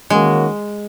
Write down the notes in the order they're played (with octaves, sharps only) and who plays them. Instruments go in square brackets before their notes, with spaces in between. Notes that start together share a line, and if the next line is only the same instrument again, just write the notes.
[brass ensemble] D#3 A#3 C#4 F#4 [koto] G#3